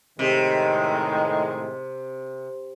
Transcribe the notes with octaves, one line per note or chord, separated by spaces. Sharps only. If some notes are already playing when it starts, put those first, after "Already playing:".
A2 C3 D#3 G#3